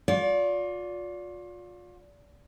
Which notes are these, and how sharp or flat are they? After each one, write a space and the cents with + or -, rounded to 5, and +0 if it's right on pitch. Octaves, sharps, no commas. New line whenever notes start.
F4 +35 D5 -25